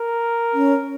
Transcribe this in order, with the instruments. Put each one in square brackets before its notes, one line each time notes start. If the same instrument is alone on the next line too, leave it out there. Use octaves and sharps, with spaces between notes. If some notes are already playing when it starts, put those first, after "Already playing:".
Already playing: [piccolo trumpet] A#4
[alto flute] C#4